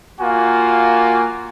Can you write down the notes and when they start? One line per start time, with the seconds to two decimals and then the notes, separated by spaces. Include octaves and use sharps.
0.20 A#3 F4 F#4 G#5